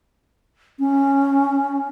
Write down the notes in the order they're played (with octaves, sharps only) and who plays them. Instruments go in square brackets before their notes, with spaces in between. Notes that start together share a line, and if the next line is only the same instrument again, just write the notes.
[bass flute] C#4